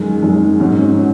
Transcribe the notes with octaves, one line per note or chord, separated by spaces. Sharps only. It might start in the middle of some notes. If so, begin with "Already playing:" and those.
Already playing: F#2 D#3 G#3
F#2 D#3 G#3
G#2 D#3 F#3 C#4
F#3 C#4